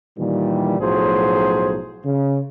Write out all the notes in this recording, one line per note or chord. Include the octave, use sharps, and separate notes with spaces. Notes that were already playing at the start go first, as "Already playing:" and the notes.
A#2 D#3 E3 G3
B1 A2 F3 F#3 G#4 C5
C#3